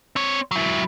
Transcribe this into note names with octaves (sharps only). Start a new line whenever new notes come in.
C4 C#5
F#3 E4